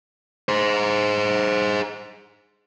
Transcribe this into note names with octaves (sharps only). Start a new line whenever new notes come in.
G#4 C5